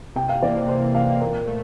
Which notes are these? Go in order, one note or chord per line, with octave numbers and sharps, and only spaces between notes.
C3 G5
F5
E3 A#3 D5
C5
C3 C5
E3 A#3 F5
A#2 A#4
A3